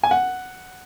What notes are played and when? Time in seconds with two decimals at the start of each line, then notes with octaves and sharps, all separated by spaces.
0.03 G#5
0.11 F#5